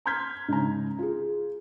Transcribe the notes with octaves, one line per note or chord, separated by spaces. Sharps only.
A#5 C6 F6 G6 G#6 B6
G#2 C#3 A#5
F4 G#4